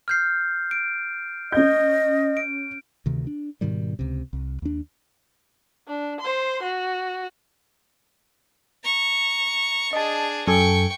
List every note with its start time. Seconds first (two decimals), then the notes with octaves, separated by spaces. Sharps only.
0.08 F6 G6 C7
0.71 D7
1.52 C#4 D#5 G6
2.37 D7
3.06 D2 C3 D#3
3.27 D4
3.61 G#2 B2 D#3 G3
3.99 C#2 C3
4.33 C2
4.62 D#2 D4
5.88 D4
6.20 C5 C6
6.63 F#4
8.84 A#5 C#6
9.93 D4 G#4 D#5 A5
10.47 F#2 A4 G5 G#5 C#6